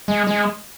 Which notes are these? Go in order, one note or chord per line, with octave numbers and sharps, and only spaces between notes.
G#3
G#3